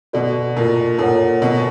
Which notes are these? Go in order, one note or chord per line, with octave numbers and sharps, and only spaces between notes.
B2 F#4 A4 D5
A#2
A#2 A4 C#5 F#5
B2